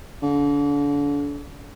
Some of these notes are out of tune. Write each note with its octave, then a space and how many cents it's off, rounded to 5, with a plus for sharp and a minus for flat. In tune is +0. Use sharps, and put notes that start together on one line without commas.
D3 -35